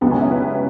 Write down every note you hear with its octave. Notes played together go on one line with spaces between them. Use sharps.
C#2 B2 F#3 B3
C#4
E4
B4